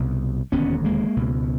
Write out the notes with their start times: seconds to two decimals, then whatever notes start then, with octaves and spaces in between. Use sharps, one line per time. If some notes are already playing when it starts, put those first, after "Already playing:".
Already playing: C2 B2
0.52 E1 D#2 D3 B3 C#4
0.84 G#3 A#3
1.17 C#2 B2